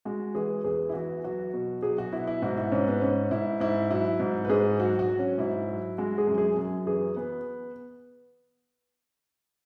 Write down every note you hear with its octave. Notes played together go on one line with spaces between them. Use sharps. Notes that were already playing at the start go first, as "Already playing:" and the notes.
G#3 F#4
E3 G#4
E2 G#4
E4
E3 F#4
F#3 F#4
B2
F#3 G#4
F#4
B2 E4
E4
G#2 F#4
E4
G#2 C#4
B3
G#2 C#4
G#2 E4
G#2 E4
F#3 E4
G#2
B4
G#2 G#4
F#3 F#4
F#4
F#3
C#4
G#2 E4
F#3
G#3 F#4
G#4
F#2
G#4
F#2
E3 G#4
B3